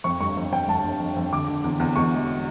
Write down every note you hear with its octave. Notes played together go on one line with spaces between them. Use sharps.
F2 C#6
G1 C#6
F2
F2 G5
G1 A5
G1
F2
F2
D3 D6
D3
E2
E2
E2 C#6
E1